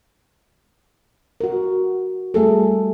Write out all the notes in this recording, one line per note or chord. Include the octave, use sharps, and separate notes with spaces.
F#4 A#4
G3 A3 G#4 A4